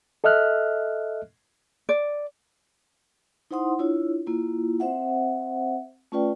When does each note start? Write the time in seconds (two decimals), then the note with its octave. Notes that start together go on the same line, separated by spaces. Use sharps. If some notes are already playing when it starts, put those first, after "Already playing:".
0.24 A4 D#5 E5 F6 F#6
1.89 D5
3.51 D#4 E4 C5 F#5 C6 D#6
3.79 D4 E4 F4 C#5
4.27 A#3 E4 F4
4.80 C4 C5 E5 F#5
6.12 A3 C#4 F4 B4 D5 G5